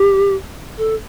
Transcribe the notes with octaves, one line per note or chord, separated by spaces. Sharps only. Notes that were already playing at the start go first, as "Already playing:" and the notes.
Already playing: G4
A4